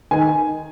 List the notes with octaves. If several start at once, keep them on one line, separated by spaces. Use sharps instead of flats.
D#3 G#5